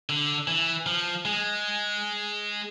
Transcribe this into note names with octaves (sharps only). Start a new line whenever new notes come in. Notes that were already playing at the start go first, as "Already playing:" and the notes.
D3
E3
F3
G#3